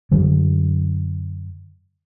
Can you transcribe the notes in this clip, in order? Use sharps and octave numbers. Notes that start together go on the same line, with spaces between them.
F#2 D3 F#3